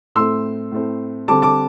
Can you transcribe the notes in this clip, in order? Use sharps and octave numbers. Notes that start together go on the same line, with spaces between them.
A2 A3 C4 C6 E6
A2 A3 C4
D3 G3 C4 A5 D6
A5 D6